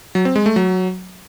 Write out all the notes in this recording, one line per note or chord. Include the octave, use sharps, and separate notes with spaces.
F#3
C4
G#3
A3
F#3